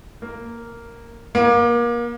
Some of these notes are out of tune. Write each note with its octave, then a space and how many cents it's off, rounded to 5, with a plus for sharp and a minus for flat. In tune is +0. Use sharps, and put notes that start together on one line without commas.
A#3 -5
A#3 +30